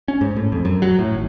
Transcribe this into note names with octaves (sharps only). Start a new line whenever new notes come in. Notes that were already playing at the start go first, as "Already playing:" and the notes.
C#4
G#2
A2
F2
F#2
F#3
A2
G#1